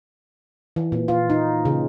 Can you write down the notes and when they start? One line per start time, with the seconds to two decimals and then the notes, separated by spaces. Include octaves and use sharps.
0.76 E3
0.92 A#2
1.08 F4
1.30 D#4
1.65 C#3